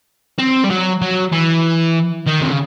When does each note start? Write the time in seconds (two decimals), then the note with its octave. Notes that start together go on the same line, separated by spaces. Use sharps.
0.39 C4
0.64 G3
0.70 F#3
1.02 F#3
1.32 E3
2.27 D#3
2.42 C3
2.51 C#3